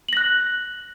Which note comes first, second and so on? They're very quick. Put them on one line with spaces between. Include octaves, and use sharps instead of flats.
F#7 A#6 F#6